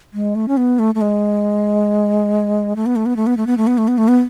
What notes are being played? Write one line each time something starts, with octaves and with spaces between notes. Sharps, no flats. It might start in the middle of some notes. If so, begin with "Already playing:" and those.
G#3
A3
C#4
B3
A3
A3
G#3
A3
B3
A3
B3
A3
B3
A3
B3
A3
B3
A3
B3
A3
B3